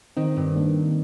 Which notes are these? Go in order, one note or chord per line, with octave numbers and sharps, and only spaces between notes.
D#3 C4 D#4
G2
A#3 D4